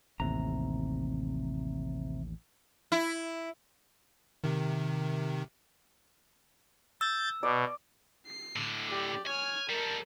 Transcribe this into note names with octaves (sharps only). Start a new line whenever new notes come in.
A1 D#2 C3 A#5
E4
C3 D#3
E6 G6 A6
B2 D5
C7
A2 D3
G4 D5
C#5 G#5 F6
G3 A4 A#4